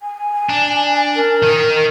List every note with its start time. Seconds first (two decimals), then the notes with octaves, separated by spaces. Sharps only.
0.01 G#5
0.49 D4
1.15 A#4
1.43 D#3